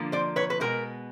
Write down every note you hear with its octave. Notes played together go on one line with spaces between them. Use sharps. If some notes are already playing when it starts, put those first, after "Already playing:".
Already playing: D3 F3 A#3
C5 D5
B4 C#5
B4
B2 G#3 B3 A#4 C5